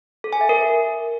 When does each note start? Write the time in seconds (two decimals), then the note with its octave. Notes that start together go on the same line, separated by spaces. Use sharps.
0.24 A4
0.33 G#5
0.41 E5
0.49 A#4